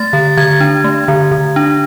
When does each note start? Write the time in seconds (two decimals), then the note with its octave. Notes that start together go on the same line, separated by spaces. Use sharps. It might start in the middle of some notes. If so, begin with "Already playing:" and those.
Already playing: A3 A6
0.13 D3
0.37 D3 G#6
0.61 D4
0.84 A3
1.08 D3
1.31 D3
1.56 D4